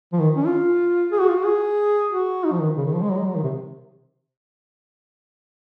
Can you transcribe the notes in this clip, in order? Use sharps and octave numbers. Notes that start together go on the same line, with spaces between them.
F3
D#3
C#4
F4
G#4
F#4
F4
F#4
G#4
F#4
D#4
F3
D#3
C#3
D#3
F3
G#3
F#3
G#3
F#3
D#3
C3